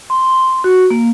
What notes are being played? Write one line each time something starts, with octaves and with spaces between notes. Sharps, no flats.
C6
F#4
A#3